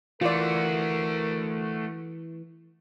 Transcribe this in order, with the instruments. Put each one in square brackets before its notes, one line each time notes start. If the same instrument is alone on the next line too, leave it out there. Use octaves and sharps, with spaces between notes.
[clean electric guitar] E3 [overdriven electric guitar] A3 F#4 [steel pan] F4 D5 [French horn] A#4